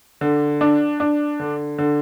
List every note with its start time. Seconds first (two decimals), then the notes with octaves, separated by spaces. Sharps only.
0.21 D3
0.61 D4
1.00 D4
1.40 D3
1.78 D3